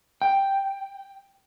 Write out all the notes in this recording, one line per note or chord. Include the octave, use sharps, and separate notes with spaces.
G5